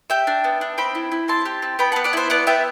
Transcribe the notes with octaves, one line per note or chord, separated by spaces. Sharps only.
G4 E5 G5
D4
B3
D4
C4 G5 B5
E4
E4
C4 A5 C6
G4
C4
B3 G5 B5
B3 F#5 A5
D5 F#5
E4 C5 E5
B3 D5 F#5
B3 E5 G5